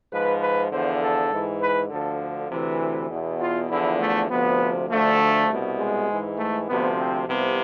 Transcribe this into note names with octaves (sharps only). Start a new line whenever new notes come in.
G#2 F3 B4
B4
E2 D3 F3 C5
A4
G#2 E3
B4
D2 D3 F3 A4
D2 C3 E3
E2 B2
F4
E2 D3 F3 E4
A3
D2 C3 F3 B3
D2 D3 F3 A3
C2 B2
G#3
G#2 E3
A3
D2 C3 F3 B3
C4
C2 C3 F3 B3